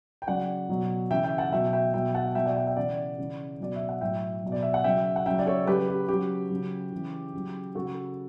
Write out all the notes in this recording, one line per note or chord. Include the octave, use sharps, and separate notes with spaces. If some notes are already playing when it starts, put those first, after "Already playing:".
G5
C#3 F#3 D5 F#5
B2 F#3
C#3 E3 E5 G5
E5 G5
F#5 A5
B2 F#3 E5 G5
E5 G5
B2 F#3 E5 G5
F#5 A5
B2 F#3 E5 G5
D5 F#5
E5 G5
E5 G5
C#3 E3 D5 F#5
C#3 E3
B2 F#3 D5
E5
F#5
A2 F#3 E5 G5
B2 F#3
D5
E5
F#5
C#3 F#3 E5 G5
F#5
C#3 F#3 E5 G5
D5
A4 C#5
C#3 F#3 G4 B4
G4
C#3 F#3 G4
C#3 F#3
C#3 E3
C#3 F#3
C#3 F#3 F#4 A4